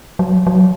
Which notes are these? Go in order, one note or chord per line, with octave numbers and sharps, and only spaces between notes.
F#3
F#3